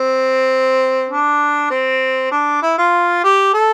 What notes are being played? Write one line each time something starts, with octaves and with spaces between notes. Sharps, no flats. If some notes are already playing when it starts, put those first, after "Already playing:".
Already playing: C4
D4
C4
D4
E4
F4
G4
A4